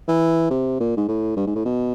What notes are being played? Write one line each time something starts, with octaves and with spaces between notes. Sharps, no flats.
E3
C3
A#2
G#2
A2
G2
G#2
A2
B2